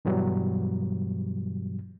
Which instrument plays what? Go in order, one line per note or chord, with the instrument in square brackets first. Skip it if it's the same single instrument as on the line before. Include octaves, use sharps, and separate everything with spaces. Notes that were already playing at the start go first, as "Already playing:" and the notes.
[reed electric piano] G2 B2 E3 F#3 G3